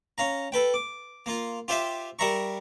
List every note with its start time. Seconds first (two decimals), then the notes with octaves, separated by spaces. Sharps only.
0.18 C#4 F5 A#5
0.52 A4 B4 G5
0.74 D6
1.26 A#3 F4
1.68 F4 G4 C5 E5 F5
2.19 G3 A#4 E5 A#5 C#6